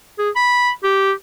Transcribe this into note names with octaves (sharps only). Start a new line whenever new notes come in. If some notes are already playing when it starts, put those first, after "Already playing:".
G#4
B5
G4